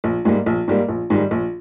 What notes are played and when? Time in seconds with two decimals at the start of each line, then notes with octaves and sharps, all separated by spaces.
0.04 A#1
0.25 G#2 G3 A#3
0.46 A#1
0.68 G#2 G3 A#3
0.89 A#1
1.10 G#2 D#3 G3
1.31 A#1